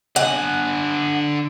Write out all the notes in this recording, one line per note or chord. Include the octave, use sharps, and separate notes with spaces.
D3 F#5 G#5